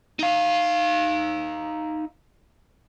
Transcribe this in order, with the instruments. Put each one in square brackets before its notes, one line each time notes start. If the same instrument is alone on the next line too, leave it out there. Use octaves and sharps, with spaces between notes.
[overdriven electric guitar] D#4 F5